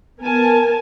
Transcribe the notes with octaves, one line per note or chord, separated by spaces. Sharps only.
B3 A#4 G#5 A5